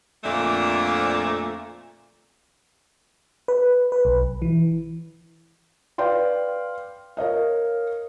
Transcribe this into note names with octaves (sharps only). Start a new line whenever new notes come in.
F2 A#2 D3 A3 A#3 D5
B4
B4
B1
E3
B4 D5 F5 G5 C6
A#4 C#5 D#5 F5